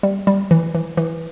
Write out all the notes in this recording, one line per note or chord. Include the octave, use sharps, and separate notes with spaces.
G3
G3
E3
E3
E3